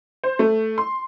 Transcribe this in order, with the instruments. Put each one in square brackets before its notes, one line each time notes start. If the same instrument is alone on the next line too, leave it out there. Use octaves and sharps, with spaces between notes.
[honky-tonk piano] C5
A3
C6